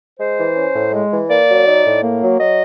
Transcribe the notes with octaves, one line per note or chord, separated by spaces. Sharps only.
G#3 C5
E3
C#4
A2
G#3
E3
A#3 D5
F#3
D#4
A2
A#3
F#3
F#3 D#5